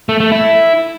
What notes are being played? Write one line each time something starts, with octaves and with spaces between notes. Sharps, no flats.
A3
A3
E4